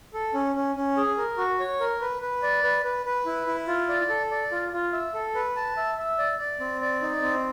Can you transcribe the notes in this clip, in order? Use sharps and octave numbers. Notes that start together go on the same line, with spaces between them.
A4
C#4
C#4
C#4
G#4
A#4
F#4
C#5
A#4
B4
B4
D5
B4
B4
B4
E4
E4
F4
D5
A4
D5
F4
F4
E5
A4
B4
A5
E5
E5
D5
D5
C4
D5
D#4
C4